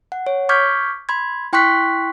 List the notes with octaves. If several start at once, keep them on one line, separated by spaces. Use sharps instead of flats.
F#5
C#5
C#6 D6 F6 G6 G#6 B6
B5 C6 G#6
E4 G5 C6 C#6 F#6 B6